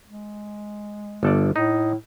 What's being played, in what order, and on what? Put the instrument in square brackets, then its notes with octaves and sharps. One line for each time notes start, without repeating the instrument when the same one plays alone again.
[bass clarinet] G#3
[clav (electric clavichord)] G1 A4 D5
[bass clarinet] A2 [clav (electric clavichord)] D#4